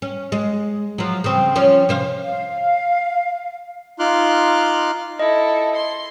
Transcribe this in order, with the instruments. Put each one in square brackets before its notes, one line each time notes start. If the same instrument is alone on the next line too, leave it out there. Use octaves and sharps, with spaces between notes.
[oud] C#4
G#3
F3 F#3
C#3 C4
F3 C#4 C#5
C3 C5 F5
[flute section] F5
[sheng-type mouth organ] D#4 F4 C6 D6 F6 F#6
[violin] E4 A4 [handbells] D#5
[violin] C6